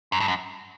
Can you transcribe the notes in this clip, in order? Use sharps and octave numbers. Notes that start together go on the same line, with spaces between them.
F#2
G2
F#2